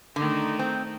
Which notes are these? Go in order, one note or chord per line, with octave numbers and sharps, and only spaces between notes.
D3 D#3 A3 D#4
C4